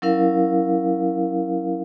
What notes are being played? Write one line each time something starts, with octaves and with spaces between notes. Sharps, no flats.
F#3 C#4 E4 A#4 F5